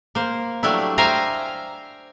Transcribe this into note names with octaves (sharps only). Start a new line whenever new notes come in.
A#3 C5
F#3 G3 A3 D4 E4
C5 E5 F5 G5 G#5 A#5